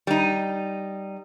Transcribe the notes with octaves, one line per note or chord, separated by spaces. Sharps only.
G3 D#4